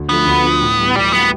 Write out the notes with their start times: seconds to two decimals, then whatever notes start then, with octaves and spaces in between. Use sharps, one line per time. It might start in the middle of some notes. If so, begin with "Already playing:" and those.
Already playing: D2
0.09 D3 F3 A3 B3
0.26 D2
0.43 D3 F3 A3
0.61 A2
0.78 E3 G3
0.96 A2 G3
1.12 E3 G3 B3